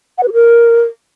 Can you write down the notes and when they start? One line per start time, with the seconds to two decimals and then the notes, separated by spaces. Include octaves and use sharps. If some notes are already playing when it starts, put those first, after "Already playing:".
0.18 F#5
0.23 B4
0.28 G4
0.33 A#4